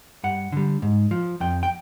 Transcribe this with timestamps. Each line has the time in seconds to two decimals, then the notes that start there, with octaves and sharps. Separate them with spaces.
0.24 G2 F#5
0.52 D3 G3
0.82 G#2
1.11 F3
1.40 F2 G5
1.63 G5